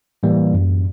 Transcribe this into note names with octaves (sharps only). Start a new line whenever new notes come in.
A2 E3 G3 A#3
F#2